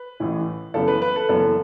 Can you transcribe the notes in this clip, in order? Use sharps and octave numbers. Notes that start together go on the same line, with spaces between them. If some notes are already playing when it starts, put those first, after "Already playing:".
Already playing: B4
A1 A2 E3
F#1 F#2 C#3 E3 B3 A4
B4
B4
A4
F#1 F#2 C#3 E3 B3 A4